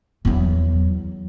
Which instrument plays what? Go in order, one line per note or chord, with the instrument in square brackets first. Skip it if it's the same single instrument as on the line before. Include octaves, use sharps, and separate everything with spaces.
[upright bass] E2 F#3